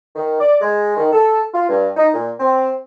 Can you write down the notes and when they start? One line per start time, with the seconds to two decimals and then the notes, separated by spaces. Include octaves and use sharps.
0.16 D#3
0.39 D5
0.61 G#3
0.96 D#3
1.12 A4
1.53 F4
1.68 G2
1.96 D#4
2.13 A#2
2.39 C4